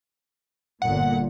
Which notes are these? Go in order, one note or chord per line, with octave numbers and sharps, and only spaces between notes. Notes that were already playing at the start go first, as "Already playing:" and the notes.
G1 A#2 F#5